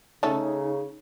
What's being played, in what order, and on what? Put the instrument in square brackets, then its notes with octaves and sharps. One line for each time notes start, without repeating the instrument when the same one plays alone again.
[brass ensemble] C#3 [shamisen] A3 C#4 A4 [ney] D#4